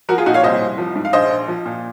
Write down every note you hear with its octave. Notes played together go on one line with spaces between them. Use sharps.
F3 F#4 A#4
F4 G#4
A#2 D#4 F#4
C#5 F5
C2 C5 D#5
C2
F3
G#2
F5
A#1 C5 D#5
A#1
F3
A#2